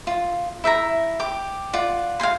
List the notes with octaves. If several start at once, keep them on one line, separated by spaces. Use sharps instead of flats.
F4
E4 E5 G5 A#5
G4 D6
F4 D5 F#5
F5 G5 G#5 C6